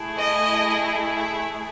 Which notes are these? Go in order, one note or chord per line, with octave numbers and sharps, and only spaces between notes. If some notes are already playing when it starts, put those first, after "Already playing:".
Already playing: A3 E4 G#4
D#5
E5